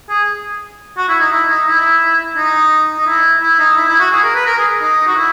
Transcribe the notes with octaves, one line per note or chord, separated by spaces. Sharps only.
G#4
F#4
E4
D#4
E4
D#4
E4
D#4
D#4
E4
E4
D#4
E4
E4
F#4
G#4
A#4
B4
A#4
G#4
D#4
F#4
E4